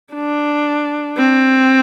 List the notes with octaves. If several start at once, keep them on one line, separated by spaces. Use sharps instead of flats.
D4
C4